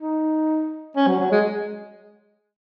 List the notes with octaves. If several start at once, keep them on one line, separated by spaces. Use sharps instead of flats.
D#4
C#4
F#3
F#3
G#3